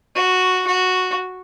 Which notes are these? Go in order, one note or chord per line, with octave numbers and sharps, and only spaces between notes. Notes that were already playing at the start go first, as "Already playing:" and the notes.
F#4
F#4